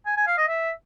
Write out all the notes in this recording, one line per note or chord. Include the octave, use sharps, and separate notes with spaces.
G#5
G#5
F5
D#5
E5